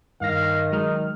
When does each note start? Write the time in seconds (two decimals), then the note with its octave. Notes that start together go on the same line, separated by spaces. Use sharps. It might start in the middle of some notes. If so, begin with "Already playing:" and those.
0.21 G2 D#3 F5 A#6
0.72 F#3 G#3 D#4 F6